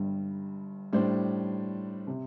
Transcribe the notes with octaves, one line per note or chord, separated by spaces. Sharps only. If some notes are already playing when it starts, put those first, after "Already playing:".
Already playing: G1 G2 G3
A2 G3 D4 C5
C3